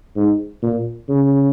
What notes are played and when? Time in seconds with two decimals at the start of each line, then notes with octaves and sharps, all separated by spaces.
0.16 G#2
0.63 A#2
1.09 C#3